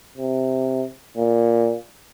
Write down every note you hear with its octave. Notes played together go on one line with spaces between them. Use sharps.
C3
A#2